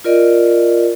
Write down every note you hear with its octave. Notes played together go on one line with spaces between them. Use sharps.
F4 A#4 D5 D#5